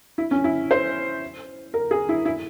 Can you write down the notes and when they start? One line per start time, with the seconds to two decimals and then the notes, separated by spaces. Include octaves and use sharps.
0.18 E4
0.31 C#4
0.44 E4
0.71 C5
1.74 A#4
1.91 G#4
2.09 E4
2.25 E4